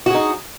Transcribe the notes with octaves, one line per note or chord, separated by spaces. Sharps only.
D#4 F#4 G#4